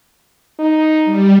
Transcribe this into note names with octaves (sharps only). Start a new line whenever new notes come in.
D#4
G3